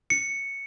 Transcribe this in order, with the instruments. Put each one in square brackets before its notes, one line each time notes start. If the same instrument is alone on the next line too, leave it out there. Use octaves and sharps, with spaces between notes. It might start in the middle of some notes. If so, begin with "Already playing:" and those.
[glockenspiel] C#7